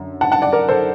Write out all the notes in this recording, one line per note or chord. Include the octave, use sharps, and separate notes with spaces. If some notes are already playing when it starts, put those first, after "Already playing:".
Already playing: F#2 D3
F#5 A5
F#5 A5
D5 F#5
A#4 D5
A4 C5